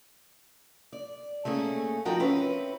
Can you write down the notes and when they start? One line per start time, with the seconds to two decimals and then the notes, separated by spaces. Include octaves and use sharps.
0.93 D5
1.45 A3 A#3 C#4 G#4
2.05 G2 F3 D#4 F#4 A#4 G5
2.20 C4 C#4 E4 B4